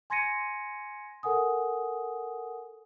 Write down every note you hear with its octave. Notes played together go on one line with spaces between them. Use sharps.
G#5 C6 G#6 A#6 C#7 D#7
A4 A#4 F#5 G#5 D#6